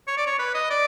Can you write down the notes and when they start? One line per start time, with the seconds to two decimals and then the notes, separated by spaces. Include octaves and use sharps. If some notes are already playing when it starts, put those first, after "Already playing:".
0.07 C#5
0.17 D5
0.26 C#5
0.39 B4
0.54 D#5
0.70 D5